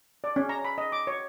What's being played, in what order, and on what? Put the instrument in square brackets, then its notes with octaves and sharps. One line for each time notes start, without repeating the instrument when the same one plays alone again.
[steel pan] D5
C#4
A#5
B5
D#5
D6
C#5